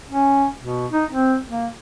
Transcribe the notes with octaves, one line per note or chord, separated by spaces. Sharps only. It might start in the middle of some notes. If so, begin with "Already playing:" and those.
C#4
B2
D#4
C4
A#3